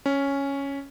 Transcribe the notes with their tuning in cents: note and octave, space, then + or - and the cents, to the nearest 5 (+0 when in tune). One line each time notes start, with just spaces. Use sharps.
C#4 +0